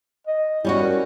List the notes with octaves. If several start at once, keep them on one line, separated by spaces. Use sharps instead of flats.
D#5
G3 C#4 E4 F#4
A#4